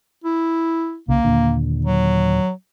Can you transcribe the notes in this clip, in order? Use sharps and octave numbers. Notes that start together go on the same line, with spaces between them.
E4
C2 C#3 A#3
D#2 A#2 D3
F#3